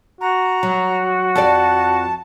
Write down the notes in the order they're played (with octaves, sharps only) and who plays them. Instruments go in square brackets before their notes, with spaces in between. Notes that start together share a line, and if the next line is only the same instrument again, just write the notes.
[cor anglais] F#4 [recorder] A#5
[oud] F#3
[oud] F2 D5 [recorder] A5